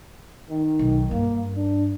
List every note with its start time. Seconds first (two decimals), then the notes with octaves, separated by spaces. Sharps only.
0.50 D#3
0.79 B1
1.11 G2 A#3
1.56 D4